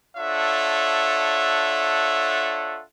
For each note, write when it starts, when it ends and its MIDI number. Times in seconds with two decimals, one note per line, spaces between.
0.17 2.82 62
0.17 2.82 65
0.17 2.82 69
0.17 2.82 73
0.17 2.82 76
0.17 2.82 78